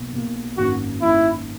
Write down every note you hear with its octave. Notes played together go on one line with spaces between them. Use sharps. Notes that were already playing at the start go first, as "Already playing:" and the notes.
Already playing: B1 B2 A#3
B1 B2 A#3
G#1 F#2 D#3 A#3 C#4 F#4
G#1 F#2 D#3 A#3 C#4 E4